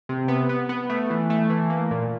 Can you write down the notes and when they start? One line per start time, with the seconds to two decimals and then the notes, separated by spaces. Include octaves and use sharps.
0.09 C3
0.28 B3
0.49 B3
0.69 B3
0.90 A3
1.10 E3
1.30 A3
1.50 E3
1.70 A#3
1.91 A#2